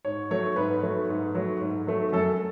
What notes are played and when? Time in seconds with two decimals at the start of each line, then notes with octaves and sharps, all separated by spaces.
0.05 G#2 C#5
0.31 F#3 A3 C#5
0.56 G#2 B4
0.83 F#3 A3
1.09 G#2
1.35 F#3 A3
1.61 G#2
1.87 F#3 A3
2.13 F#2 A4